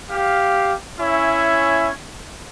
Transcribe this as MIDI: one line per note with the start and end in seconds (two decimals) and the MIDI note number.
0.11 0.74 67
0.11 0.74 77
1.00 1.91 61
1.00 1.91 64
1.00 1.91 73
1.00 1.91 76
1.00 1.91 80